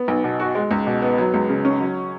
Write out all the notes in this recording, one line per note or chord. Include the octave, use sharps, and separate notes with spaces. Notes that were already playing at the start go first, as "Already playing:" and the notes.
Already playing: B3
B1
B2
F#4
G#3
C#2
B2
B3
F#3
C#2
C#3
C#4
F#3